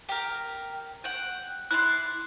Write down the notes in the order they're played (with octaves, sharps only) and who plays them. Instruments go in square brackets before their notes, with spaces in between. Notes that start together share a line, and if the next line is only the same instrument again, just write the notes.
[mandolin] G4 A#4
F#5 G5
[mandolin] E4 D5 C6 [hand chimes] F#6